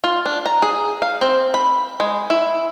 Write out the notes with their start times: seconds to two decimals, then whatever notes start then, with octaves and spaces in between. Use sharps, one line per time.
0.04 F4
0.26 D4
0.46 A#5
0.62 G#4
1.02 F5
1.21 C4
1.54 B5
2.00 G#3
2.30 E4